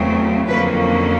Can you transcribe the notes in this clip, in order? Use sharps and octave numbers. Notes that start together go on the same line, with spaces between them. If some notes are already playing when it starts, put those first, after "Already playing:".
Already playing: E2 C#3 F#3 A3 C4
F2 D3 F#3 A#3 C#4 B4